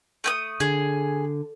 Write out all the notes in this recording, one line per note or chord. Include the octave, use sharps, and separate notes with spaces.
A3 G5 D#6
D3 G#4